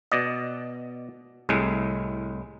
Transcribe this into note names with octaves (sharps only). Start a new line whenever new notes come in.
B2 D5 D#5
C2 A2 G#3